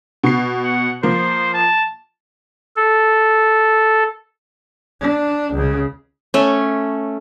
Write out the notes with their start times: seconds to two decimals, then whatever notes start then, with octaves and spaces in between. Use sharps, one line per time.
0.23 B2 C7
0.64 F#5
1.03 F3 A#3 C5
1.54 A5
2.76 A4
5.00 D4
5.54 C#2 C#3
6.34 A3 C#4